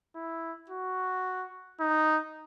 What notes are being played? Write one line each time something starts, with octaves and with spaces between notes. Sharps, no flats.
E4
F#4
D#4